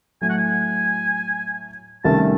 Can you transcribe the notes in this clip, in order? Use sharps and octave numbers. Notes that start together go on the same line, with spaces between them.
A2 F#3 A3 G#5
F#5
G#5
C2 C3 D#3 A3 C#4 A5